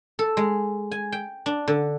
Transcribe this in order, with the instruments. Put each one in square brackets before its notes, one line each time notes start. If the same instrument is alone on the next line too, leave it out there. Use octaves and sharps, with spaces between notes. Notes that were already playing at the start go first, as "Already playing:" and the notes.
[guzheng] A4
G#3
G#5
G5
D4
D3